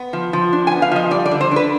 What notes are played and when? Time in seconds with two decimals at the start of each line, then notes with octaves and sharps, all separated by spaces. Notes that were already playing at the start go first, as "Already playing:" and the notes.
Already playing: B3
0.13 F3
0.33 F3
0.53 D4
0.67 G#5
0.72 B3
0.82 F5
0.92 F3 D#5
1.11 G3 D5
1.26 D5
1.31 D3
1.41 C5
1.51 D4 B4